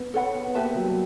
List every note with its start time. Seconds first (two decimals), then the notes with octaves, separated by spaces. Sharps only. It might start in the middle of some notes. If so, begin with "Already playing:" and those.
Already playing: B3
0.14 B3 A4 C#5 F#5 B5
0.47 B3
0.55 A#3 G4 B4 E5 A5
0.75 F#3
0.83 G3